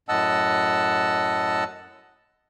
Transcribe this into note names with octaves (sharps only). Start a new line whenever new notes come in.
F#2 A2 D#5 F#5 A5 E6